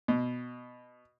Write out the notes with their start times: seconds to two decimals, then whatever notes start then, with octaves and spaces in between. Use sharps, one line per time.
0.08 B2